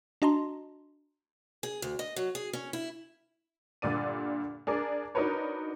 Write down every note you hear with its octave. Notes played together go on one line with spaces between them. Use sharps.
D4 F#4 D#5 A5 A#5 C6
G#4
D2
D#5
F#3
G#4
C#4
E4
G2 A#2 D3 D5 D#7
D4 G#4 A#4 D5
D4 D#4 F#4 A#4 B4 C#5